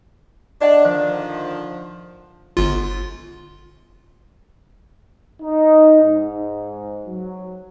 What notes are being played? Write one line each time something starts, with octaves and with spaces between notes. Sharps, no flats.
D4 D5 D#5 F#5
D3 D#3 F3 C5
G1 F4
D#4
G#2
F#3